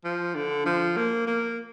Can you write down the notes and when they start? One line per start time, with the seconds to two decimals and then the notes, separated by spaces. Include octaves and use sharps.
0.04 F3
0.35 D3
0.66 F3
0.97 A#3
1.27 A#3